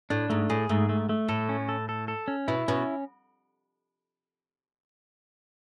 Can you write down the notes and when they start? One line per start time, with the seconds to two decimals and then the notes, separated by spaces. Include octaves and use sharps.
0.10 A2 D4
0.30 G#2 A3
0.50 A2 G#4
0.69 G#2 A3
0.89 A3
1.09 A3
1.29 A2 A4
1.49 C#4
1.69 A4
1.89 A4
2.08 A4
2.28 C#4
2.48 B2 E4
2.68 B2 C#4